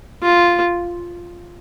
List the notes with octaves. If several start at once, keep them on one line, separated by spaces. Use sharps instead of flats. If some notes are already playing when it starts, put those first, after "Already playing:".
F4